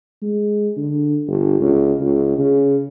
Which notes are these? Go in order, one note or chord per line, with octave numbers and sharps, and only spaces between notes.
G#3
D3
G1
C#2
C#2
C#3